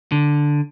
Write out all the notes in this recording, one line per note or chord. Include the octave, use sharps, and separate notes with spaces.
D3